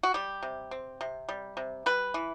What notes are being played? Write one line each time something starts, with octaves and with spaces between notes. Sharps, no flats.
F#4
G3 G4
C3
C4
C3
G3
C3
G3 B4
E3